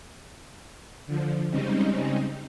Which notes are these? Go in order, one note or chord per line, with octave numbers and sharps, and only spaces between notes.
D3 F3
C#3 G3 G#3 C4 C#4 D#4